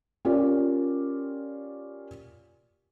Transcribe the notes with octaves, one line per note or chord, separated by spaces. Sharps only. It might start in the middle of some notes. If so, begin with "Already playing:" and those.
C#4 F4 G4 A#4 D5